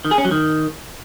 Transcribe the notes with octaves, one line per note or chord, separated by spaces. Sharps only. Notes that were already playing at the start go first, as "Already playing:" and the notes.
D#3
G#4
C#4
F#3
D#3